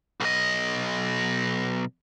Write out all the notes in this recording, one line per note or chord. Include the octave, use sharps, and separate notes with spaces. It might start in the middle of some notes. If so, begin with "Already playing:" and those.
B1 D#5